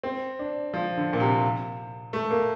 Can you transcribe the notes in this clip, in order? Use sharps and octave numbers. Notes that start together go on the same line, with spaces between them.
C4
D4
F3
D3
A#2
C3
A3
A#3